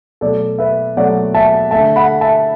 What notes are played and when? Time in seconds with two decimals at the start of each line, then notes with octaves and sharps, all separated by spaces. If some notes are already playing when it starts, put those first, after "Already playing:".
0.21 B2 F#3 A3 A4 D5
0.59 B4 E5
0.96 B2 F#3 A3 D5 F#5
1.34 E5 A5
1.71 D3 A3 E5 A5
1.96 F#5 B5
2.21 E5 A5